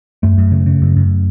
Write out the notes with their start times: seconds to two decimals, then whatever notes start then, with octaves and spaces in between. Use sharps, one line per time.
0.23 F#2 A3
0.38 F#2
0.52 C#3
0.66 C#3
0.82 F#2
0.96 F#2